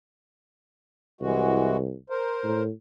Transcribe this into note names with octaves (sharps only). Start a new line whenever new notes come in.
C2 E3 G#3 F#4
A#4 C5
A2